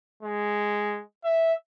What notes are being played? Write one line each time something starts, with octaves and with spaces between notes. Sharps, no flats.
G#3
E5